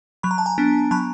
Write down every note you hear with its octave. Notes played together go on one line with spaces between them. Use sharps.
F#3 B5
A#5
A5
G#5 A#5
B3 D4
F#3 A5 B5